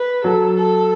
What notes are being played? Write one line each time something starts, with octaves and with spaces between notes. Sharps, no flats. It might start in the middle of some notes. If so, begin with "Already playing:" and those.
Already playing: B4
F#3 A4
A4